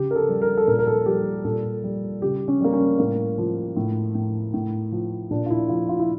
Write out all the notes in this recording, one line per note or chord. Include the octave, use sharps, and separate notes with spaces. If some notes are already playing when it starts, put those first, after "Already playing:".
Already playing: C#3 G4
A#4
A4
G3
A#4
A4
A#2 A#4
A#4
A4
G3 G4
A#2 A4
G3
C#3 G4
C#4
G3 A#3
C#4
A2 A#3
F3
A2
A2
A2
F3
A#2 D4
F4
E4
F3 F4
F4
E4